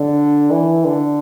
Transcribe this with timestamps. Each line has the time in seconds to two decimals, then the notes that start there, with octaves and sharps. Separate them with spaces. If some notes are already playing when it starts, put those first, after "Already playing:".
Already playing: D3
0.51 E3
0.85 D3